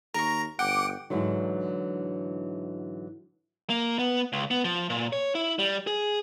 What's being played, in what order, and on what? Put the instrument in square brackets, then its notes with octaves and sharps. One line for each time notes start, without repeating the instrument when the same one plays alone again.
[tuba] D#2 [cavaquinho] A#4 C#6 [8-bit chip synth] A#5
[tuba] G1 [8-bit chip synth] F#5 [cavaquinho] G5 [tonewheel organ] D6
[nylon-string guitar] G#2 D3 E3 F#3
[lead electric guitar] A#3
B3
C#2
B3
F3
A#2
C#5
E4
G3
G#4